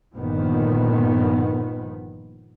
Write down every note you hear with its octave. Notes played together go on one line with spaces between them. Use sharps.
G1 A#2 D#3 F3 B3